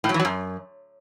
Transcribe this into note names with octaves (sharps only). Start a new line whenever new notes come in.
A2
F#3
E3
F#3
F#2